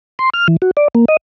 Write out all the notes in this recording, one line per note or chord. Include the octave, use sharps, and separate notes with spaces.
C6
F6
E3
F#4
D5
A#3
D#5